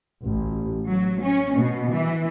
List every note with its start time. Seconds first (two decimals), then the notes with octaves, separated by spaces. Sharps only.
0.24 A1
0.89 F#3
1.21 C#4
1.55 B2
1.92 E3